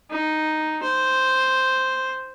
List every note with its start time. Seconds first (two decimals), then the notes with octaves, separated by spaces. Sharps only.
0.11 D#4
0.83 C5